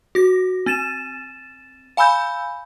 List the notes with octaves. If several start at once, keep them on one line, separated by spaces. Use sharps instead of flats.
F#4 A#6
C4 A6 D#7 E7
F5 G#5 B5 E6 G6